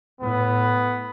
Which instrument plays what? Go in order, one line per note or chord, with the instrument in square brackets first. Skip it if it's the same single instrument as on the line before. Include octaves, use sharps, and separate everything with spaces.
[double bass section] A2 [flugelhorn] B3